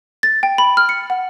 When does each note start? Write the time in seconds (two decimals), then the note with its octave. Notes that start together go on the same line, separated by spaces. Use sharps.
0.23 A6
0.43 G5
0.58 B5
0.77 F6
0.89 C#7
1.10 F#5